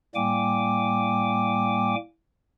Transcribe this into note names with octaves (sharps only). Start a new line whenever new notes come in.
A2 G3 A#3 G5 G#5 D6